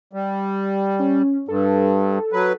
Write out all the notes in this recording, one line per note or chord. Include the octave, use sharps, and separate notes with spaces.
G3
C#4
G2 A4
F#3 B4